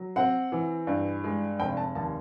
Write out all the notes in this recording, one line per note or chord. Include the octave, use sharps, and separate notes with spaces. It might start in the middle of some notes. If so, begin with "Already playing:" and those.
Already playing: F#3
C4 F#5
E3
G2
G#3
F1 G5
A5
D#2 A5